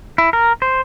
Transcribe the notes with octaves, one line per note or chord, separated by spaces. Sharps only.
E4
A#4
C5